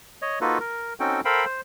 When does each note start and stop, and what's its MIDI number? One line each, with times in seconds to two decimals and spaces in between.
0.22 0.39 73
0.22 0.39 75
0.41 0.58 58
0.41 0.58 63
0.41 0.58 65
0.41 0.58 66
0.41 0.58 69
0.41 0.58 71
0.60 0.94 70
1.00 1.21 60
1.00 1.21 61
1.00 1.21 63
1.00 1.21 66
1.00 1.21 69
1.00 1.21 79
1.25 1.45 69
1.25 1.45 70
1.25 1.45 72
1.25 1.45 77
1.25 1.45 79
1.25 1.45 83
1.45 1.61 72